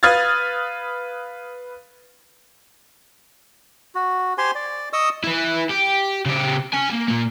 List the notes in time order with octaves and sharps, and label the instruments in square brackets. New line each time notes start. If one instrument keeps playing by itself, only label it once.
[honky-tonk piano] B4 F5 D#6 F6 G#6 A6
[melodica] F#4
G4 C5 G#5 C6
D5
D#5 C#6 D#6 E6
[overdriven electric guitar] E4 B4
G4
C#3 G4
C#4 G#5
A#3
A#2 A#3